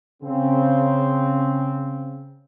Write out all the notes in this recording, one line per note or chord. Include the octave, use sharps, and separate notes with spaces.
C#3 C4